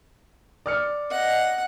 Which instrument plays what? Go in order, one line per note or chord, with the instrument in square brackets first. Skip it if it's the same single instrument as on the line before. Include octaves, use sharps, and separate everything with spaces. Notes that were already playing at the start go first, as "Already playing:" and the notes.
[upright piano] D5 F6 C#7
[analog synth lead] D#5 [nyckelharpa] F#5